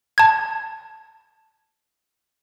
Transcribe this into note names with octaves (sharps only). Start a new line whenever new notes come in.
A5 G#6